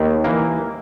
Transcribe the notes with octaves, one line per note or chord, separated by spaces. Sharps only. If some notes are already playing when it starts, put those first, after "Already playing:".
Already playing: D#2 D#3 D#4
E3 A#3